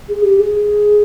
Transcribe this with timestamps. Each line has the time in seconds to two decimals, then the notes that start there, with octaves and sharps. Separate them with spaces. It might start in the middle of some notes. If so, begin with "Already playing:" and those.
0.09 G#4
0.24 G4
0.39 G#4